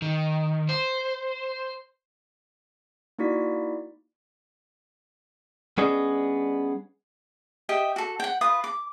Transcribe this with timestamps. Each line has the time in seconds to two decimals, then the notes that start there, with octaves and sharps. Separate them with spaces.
0.02 D#3
0.69 C5
3.19 A#3 D#4 E4 F#4 D5 B6
5.78 G3 B3 C#4 D4 G#4 D#5
7.69 G4 D#5 E5 G5
7.96 F#4 A4
8.20 F#5 G5
8.41 F4 B4 D#6
8.64 D6